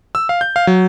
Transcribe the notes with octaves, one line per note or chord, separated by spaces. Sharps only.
E6
F5
G6
F5
F#3